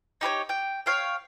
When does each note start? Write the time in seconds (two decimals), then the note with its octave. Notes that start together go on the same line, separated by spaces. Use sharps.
0.21 D#4 G4 B4 C#5
0.49 G5
0.86 C#5 F5 G5